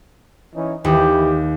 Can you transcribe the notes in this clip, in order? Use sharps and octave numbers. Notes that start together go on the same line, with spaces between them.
E3 C#4 D#4
D#2 E3 G4